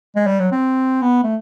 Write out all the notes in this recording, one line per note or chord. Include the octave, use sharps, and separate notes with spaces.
G#3
G3
F#3
C4
B3
A3